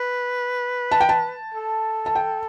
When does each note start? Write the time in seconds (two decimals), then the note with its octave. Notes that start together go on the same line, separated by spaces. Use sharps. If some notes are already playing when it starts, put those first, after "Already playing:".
Already playing: B4
0.92 A5
1.01 G5
1.09 A5
1.54 A4
2.06 A5
2.15 G5